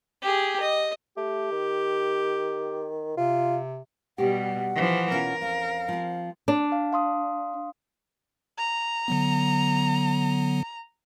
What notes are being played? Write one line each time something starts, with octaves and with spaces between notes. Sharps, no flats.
G4 G#4
D#5
A3 G4
D#3
C3 F4
B2 G3 G4 F#5
E3 F3
B2 C#4 F4 A#4
F2 C#4 F5
F3 C4
D4
F5
F5 C6 D#6
A#5
D3 F#3 B3